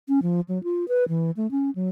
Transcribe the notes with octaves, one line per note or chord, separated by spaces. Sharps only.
C#4
F3
F#3
F4
B4
E3
A3
C#4
F#3